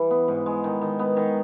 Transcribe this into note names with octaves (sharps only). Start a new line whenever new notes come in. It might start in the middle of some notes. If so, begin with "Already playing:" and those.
Already playing: E3 G3
B3
G#2
G#3
D#3
D#3
B3
D#3